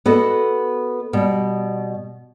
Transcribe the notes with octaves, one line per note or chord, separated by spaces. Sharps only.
B3 F#4 A4 D#5
B2 G3